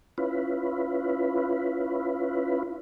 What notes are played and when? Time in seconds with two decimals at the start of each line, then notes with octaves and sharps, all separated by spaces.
0.18 C#4 E4 F4 B4